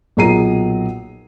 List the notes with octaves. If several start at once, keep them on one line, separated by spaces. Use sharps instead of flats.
B1 A#2 G#4 A#5 C7 D#7